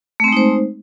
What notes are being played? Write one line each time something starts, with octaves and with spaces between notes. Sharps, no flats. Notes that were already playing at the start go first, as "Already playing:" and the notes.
G#3 A3 C4 D#4 C5